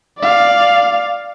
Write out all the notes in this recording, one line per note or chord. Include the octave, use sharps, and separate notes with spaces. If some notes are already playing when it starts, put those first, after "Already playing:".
D5 F5